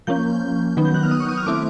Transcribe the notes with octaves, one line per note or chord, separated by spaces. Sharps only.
F3 A#3 C#4 G6
D#3 F#3 B3 D#4
G6
F#6
F6
D#6
C#6
D#6
F6
A3 C4 E4 D6